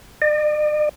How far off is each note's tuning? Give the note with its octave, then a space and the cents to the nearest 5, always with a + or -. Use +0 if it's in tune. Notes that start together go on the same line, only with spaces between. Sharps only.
D5 +45